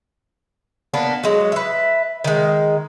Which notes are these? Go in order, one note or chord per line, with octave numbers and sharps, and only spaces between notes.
A#3 B3 D4
F#3 G#3
B4 E5
D#3 G#3